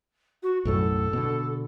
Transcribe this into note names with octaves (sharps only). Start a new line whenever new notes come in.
F#4
B1 F#2 A2 A4
B2 D3